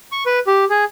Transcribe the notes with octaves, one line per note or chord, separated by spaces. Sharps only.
C#6
B4
G4
G#4